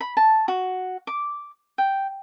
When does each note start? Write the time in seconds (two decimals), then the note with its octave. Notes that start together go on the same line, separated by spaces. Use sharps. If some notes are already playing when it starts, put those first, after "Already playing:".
0.01 B5
0.17 A5
0.48 F#4
1.07 D6
1.78 G5